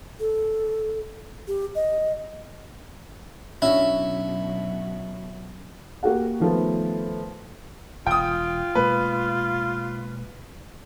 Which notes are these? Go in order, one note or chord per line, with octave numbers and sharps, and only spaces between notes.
A4
G4
D#5
B2 F#3 C#4 D4 E4 F#4
A#3 F#4 G4 F#5
D#3 F3 A3 B3
E1 F4 G5 D#6
B2 G#3 A#3 B4